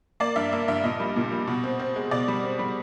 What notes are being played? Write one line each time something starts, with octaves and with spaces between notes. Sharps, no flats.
A#3 D5
G2 E5
A#3 E5
G2 E5
A#2 D#5
G3
A#2
G3
B2
C4
C4
G#3
B2 D5
G3
C4
G3